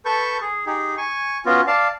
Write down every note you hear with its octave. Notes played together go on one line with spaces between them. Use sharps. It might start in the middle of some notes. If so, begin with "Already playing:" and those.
A4 B4 A5 C#6 G6
G#4
D#4 G4 G#4
G#5 C#6
B3 C#4 F4 F#4
D5 F5 A5